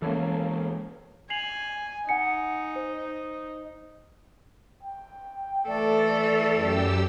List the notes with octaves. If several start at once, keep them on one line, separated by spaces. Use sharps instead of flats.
E3 G#3 A#3 C#4 A4
G#5 C7 F7 F#7
D#4 F#5 G#5 C#7
C5
G5
E3 A3 A4 D5
F#2 G4 E6